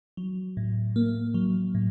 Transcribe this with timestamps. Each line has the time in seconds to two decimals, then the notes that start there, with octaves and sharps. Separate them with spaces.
0.17 F#3
0.57 A2
0.96 A#3
1.34 F#3
1.75 A2